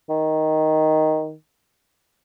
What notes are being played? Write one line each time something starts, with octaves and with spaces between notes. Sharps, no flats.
D#3